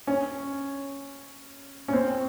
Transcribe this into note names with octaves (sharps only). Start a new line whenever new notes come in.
C#4
C#4
C4